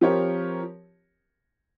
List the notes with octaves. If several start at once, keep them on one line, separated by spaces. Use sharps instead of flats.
F3 C4 G4 A#4 C#5